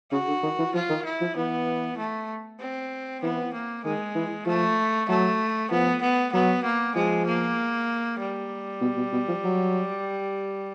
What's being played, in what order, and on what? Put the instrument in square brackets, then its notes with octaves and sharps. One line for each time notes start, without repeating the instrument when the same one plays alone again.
[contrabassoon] C#3 [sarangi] F#4
[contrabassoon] D3
D#3
E3
[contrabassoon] F3 [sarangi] F4
[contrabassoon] D#3
[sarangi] E4
[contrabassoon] F3
[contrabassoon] E3 [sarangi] B3
[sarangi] A3
C4
[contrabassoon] E3 [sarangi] B3
[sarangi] A#3
[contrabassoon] D#3 [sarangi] G#3
[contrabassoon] E3
[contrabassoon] F3 [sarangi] A3
[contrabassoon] F#3 [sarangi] A3
[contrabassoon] F3 [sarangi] B3
[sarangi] B3
[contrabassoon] F#3 [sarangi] B3
[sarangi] A#3
[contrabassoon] F3 [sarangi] G#3
[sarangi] A#3
G3
[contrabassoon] B2
B2
B2
F3
F#3